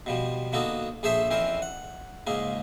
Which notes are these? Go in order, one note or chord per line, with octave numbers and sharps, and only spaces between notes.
B2 F3 G3
D3 A#3 B3 D#4 F#4 A4
A#1 G#4 A4 C5 C#5 E5
F2 E3 C#4 A#4 C5
F#5
C#2 G#2 A#3 G#4